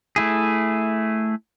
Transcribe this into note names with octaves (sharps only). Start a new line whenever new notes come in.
A3 E4 G#4